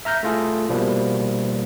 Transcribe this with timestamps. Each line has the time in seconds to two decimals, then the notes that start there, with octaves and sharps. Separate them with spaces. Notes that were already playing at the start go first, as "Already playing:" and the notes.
0.05 E5 A#5 F6 G6 A#6
0.23 A3 E4 F4 G#4 A4
0.69 B2 F3 G3 A#3 E4